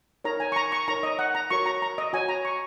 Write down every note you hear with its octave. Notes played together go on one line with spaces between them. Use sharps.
D#4 A#4 C#5 A#5
G#5
C#6
A#5
C#6
D#4 A#4 C#5 A#5
D#5
F#5
A#5
F#4 A#4 C#5 C#6
A#5
A#5
D#5
F#4 C#5 G#5
A#5
C#6